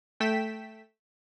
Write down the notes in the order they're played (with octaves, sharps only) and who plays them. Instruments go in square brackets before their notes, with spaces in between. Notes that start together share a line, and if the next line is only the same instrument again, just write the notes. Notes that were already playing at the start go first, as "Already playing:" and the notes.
[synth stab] A3 G5 B6 E7